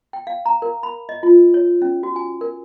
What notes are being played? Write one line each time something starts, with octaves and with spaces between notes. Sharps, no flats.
G5
F5
A#5
A#4
B5
D#5
F4
C#5
C#4
F#4
G#5
A#4